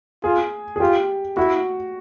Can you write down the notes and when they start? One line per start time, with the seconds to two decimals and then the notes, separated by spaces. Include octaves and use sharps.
0.24 F4 G#4
0.76 G#4
0.80 F4 G4
1.37 E4 F#4